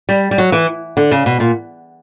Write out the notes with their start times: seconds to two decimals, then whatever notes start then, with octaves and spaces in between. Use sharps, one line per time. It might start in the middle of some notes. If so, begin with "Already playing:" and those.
0.09 G3
0.31 G3
0.38 F#3
0.52 E3
0.97 D3
1.11 C#3
1.26 B2
1.40 A#2